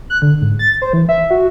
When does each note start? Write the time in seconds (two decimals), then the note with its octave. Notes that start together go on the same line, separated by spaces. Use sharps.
0.10 F#6
0.22 D3
0.41 G#2
0.59 A6
0.82 C5
0.93 E3
1.09 E5
1.31 F#4